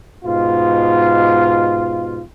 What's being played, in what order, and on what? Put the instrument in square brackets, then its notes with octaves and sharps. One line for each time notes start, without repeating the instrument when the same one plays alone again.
[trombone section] G#2 B2 F4